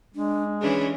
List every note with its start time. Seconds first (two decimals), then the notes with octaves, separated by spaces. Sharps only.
0.14 G#3 D4
0.61 E3 C#4 D4 G#4